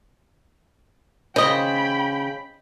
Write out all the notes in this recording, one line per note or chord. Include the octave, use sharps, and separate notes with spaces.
C#3 C5 D#5 G5 B5